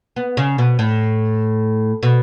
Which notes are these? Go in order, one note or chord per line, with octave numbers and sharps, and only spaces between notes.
B3
C#3
B2
A2
B2